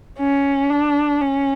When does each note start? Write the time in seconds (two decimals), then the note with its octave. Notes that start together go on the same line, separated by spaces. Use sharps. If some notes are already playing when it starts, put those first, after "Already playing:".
0.19 C#4
0.70 D4
1.21 C#4